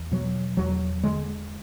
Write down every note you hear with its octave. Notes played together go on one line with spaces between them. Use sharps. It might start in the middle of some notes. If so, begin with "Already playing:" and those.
Already playing: E2
B2 F#3
E2 F#3
D3 G#3